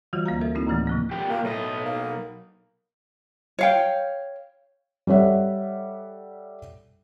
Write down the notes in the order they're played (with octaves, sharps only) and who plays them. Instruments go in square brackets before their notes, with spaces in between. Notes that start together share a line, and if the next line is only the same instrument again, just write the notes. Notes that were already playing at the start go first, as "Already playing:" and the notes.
[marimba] D3 E3 F#3 G3 F4 F#4
D2 A#3 F5 A#5
A4 A#4 E5
A#3 C4 D#4 E4 F#4
D2 A2 D#3 E3 G#3 A3
C3 F3 A#3
[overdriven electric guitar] A#2 G4
[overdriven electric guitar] A#2 [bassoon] A#3
[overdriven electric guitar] B1 D#5 [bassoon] A2
[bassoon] A#3
[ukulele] C#5 F5 G5
[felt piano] G3 A4 C#5 E5 F#5